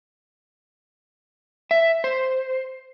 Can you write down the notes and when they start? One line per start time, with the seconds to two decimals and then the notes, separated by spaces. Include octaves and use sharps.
1.71 E5
2.04 C5